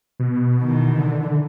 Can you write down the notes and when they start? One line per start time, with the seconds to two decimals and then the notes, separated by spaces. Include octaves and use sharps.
0.20 B2
0.61 D#3 E3
0.98 D3